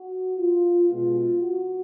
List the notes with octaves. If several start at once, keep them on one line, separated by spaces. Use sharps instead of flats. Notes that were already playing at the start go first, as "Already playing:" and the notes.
Already playing: F#4
F4
B2 G#3 B3 F4
F#4